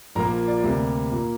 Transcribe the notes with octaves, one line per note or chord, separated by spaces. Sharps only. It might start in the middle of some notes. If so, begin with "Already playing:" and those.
A#1 A#2 F3 A#3 A#4 A#5
D5
D2 C3 G3 A#3
A#2 A#3